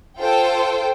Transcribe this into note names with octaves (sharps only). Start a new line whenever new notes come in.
F4 A4 C5 G5